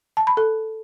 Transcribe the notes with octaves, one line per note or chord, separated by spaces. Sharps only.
A5
B5
A4